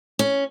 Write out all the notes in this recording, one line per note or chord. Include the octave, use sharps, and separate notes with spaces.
C#4